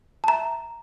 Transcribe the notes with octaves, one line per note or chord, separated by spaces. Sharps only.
A5
E5 A#5